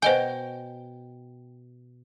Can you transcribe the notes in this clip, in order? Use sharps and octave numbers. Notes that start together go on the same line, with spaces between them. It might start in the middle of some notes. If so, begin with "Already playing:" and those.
B2 C5 D#5 G5 G#5